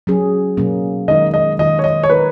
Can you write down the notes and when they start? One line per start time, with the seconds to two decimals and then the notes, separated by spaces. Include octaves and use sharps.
0.07 F#3 C#4 G#4
0.57 B2 F#3 A#3 C#4
1.08 D#3 G#3 D#4 A#4 D#5
1.34 D#5
1.59 D#3 A#3 F4 D#5
1.79 C#5
1.84 D#5
2.03 C#5
2.09 A#3 D#4 A#4 B4